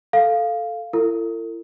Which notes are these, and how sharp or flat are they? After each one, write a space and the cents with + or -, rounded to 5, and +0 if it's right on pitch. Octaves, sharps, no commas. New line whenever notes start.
A4 +0 F5 +0
E4 +40 A4 +45